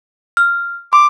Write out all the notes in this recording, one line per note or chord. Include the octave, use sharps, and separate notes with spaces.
F6
C6 D6